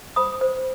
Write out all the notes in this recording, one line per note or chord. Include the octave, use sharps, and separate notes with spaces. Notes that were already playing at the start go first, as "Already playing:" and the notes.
C5 B5 D#6
C5